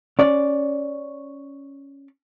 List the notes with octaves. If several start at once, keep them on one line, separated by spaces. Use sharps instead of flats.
C#4 D5